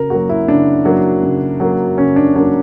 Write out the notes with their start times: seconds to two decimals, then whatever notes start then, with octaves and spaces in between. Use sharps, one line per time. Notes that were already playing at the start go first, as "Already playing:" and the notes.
Already playing: C#3 A#4
0.10 F#3 A#3 F#4
0.29 E4
0.48 C#3 D4
0.85 F#3 A#3
1.23 C#3
1.60 F#3 A#3
1.98 C#3 C#4
2.16 D4
2.35 F#3 A#3 D4